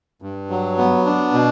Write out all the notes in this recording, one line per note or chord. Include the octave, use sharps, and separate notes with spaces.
G2
F#3
B3
D4
B2